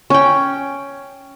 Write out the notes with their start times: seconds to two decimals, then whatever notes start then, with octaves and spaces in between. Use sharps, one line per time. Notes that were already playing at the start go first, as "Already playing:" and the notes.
0.10 C#4 G5